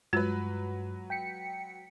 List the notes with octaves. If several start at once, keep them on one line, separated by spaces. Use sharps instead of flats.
G2 F#3 G#3 F4 B4 A6
G5 B6 C#7